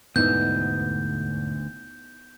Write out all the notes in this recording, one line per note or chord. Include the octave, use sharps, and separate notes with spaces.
E1 D2 G#2 D3 B3 D#4 E4 G6